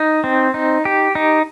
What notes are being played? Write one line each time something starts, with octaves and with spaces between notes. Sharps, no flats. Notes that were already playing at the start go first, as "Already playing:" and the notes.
Already playing: D#4
C4
D#4
G4
D#4